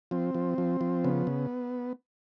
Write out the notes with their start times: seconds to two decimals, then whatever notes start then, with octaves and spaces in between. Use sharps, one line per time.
0.11 F3 C4
0.35 F3
0.58 F3
0.81 F3
1.04 C#3 B3
1.27 C#3